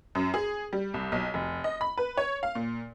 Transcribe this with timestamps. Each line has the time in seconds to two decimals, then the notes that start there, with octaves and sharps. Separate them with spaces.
0.15 F#2
0.34 G#4
0.73 G3
0.94 C2
1.12 B1
1.34 F1
1.64 D#5
1.81 B5
1.98 B4
2.17 C#5
2.43 F5
2.55 A#2